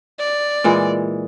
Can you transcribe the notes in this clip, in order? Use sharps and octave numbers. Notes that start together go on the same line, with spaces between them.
D5
A#2 E3 G#3